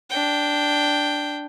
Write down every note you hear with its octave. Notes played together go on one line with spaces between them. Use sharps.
D4 G5